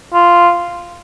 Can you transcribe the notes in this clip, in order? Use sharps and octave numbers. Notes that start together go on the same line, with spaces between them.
F4